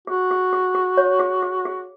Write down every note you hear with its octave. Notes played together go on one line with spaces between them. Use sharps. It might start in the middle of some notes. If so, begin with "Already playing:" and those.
F#4 G#4
G#4
G#4
G#4
C#5
G#4
G#4
G#4